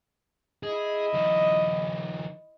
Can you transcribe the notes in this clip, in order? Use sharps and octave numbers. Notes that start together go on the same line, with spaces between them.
E4 G#4 D#5
D#3 F3